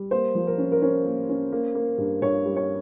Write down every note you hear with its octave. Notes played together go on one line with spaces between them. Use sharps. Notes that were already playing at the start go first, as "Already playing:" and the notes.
Already playing: G3
A#3 C5
F3
A#4
C#4
A#4
C#4 C5
A#3
C#4
A#3
A#3
G2
G2 C#5
G3
C#5